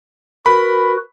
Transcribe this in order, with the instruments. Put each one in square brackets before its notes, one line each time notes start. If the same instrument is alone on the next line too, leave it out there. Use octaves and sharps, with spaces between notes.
[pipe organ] F#4 B4 [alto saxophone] A#4 [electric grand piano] B5